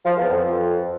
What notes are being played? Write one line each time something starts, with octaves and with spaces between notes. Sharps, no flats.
F3
E2
F2